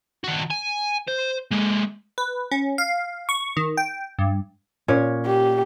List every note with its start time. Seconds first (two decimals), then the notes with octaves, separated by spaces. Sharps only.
0.24 D#3 F#4
0.51 G#5
1.08 C5
1.51 G#3 A#3
2.18 B4
2.51 C#4
2.78 F5
3.29 C#6
3.57 D#3
3.77 G5
4.19 G2
4.88 A#2 C#4 C#5
5.27 G4